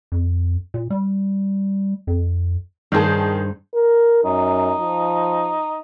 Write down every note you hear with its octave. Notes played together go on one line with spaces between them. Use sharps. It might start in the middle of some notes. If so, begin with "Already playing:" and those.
F2
A#2
G3
F2
G2 D#3 G#4 C5 A5
A#4
F#2 D#4
F3